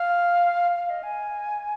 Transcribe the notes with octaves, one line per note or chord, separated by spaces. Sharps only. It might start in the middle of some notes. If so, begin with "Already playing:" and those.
Already playing: F5
F5
D#5
G#5